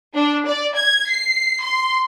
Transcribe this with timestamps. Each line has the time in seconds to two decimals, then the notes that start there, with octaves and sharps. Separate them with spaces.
0.14 D4
0.47 D5
0.75 G#6
1.09 C7
1.62 C6